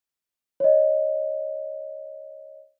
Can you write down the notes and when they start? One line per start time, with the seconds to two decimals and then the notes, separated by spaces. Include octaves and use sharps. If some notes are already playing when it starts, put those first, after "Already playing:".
0.60 C#5 D#5